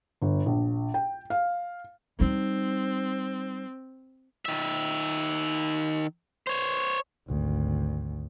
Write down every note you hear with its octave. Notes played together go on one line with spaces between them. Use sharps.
G1
A#1
G5
F5
G3 C4 D#4
D#3 E5
C5 C#5
G#1 D2